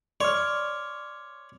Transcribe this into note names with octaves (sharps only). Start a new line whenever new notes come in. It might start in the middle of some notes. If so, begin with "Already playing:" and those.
C#5 D5 C6 D6 F6